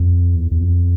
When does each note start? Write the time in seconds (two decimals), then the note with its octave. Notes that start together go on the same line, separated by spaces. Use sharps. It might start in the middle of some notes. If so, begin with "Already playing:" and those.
Already playing: F2
0.35 E2
0.51 E2
0.60 F2